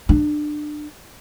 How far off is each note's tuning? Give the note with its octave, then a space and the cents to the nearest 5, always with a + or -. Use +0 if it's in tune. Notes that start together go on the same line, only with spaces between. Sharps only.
D4 +25